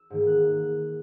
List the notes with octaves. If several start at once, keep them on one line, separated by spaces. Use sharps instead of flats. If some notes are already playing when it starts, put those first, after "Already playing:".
Already playing: E6
G#2 D#3 A#3
F#6